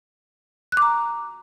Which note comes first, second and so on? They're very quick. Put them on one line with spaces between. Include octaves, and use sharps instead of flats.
F#6 D6 A#5